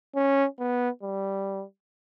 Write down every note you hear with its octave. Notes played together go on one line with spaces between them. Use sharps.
C#4
B3
G3